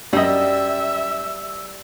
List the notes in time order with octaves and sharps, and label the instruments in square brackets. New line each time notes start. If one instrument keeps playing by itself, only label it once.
[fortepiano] F#2 D#5 [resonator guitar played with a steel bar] G3 [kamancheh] E5 [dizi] E6